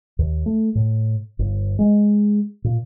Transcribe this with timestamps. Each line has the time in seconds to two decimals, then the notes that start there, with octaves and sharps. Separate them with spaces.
0.19 D#2
0.46 A3
0.75 A2
1.39 G1
1.79 G#3
2.64 A#2